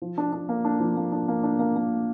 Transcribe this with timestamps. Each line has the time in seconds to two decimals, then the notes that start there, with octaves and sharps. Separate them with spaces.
0.02 F3
0.18 D4
0.33 D4
0.49 A#3
0.65 D4
0.80 F3
0.97 A#3
1.12 D4
1.28 A#3
1.43 D4
1.59 A#3
1.76 A#3